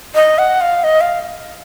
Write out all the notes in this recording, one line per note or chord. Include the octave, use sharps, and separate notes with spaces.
D#5
F#5
F5
D#5
F5